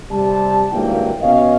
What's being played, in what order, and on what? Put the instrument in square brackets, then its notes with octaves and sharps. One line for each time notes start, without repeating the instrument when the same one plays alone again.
[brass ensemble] C3 G3 A5
G#1 G2 F#3 A#3 E4 G5
B2 C#4 D#5 F5